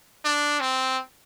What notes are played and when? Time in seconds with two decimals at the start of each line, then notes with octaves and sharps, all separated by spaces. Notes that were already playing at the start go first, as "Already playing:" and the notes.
0.25 D4
0.60 C4